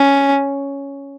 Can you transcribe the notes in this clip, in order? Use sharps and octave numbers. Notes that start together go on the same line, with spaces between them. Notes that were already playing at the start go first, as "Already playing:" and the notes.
Already playing: C#4